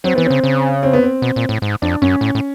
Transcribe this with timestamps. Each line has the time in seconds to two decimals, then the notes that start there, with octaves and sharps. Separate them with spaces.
0.04 F#3 C4
0.15 E3 B3
0.25 C4
0.30 C#3
0.44 C#3
0.83 C4
0.93 B3
1.03 C4
1.22 B2
1.36 A#2
1.49 A2
1.62 G#2
1.82 F2 D4
2.02 F#2 C#4
2.21 A2
2.35 A2